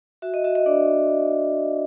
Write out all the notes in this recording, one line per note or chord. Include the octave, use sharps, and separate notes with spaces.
F#4 E5
D#5
F#4 E5
D#5
D4 D5